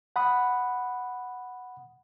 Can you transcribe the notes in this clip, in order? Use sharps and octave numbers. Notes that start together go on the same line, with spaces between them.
F#5 B5 D#6